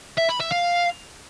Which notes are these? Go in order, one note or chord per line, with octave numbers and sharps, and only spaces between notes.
E5
B5
E5
F5